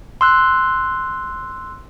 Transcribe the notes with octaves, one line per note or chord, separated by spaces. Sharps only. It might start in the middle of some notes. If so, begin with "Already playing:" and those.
C6 E6 F#6